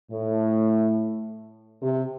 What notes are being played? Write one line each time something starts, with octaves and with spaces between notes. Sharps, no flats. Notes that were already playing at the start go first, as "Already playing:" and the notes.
A2
C3